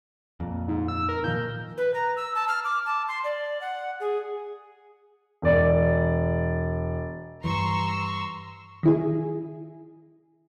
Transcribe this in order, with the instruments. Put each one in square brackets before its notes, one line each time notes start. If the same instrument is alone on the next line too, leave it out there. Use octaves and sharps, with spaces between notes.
[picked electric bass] F2 A#2
[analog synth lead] G#2
E6
A#4
[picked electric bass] A#2 D#3 F3 [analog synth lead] G6
[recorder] B4
A#5
E6
A5
F6
D6
A5
C6
D5
F#5
G#4
[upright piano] E1 D5
[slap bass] G2 E3 [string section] A#5 C6 E6 [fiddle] C#6
[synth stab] D#3 E4 G#4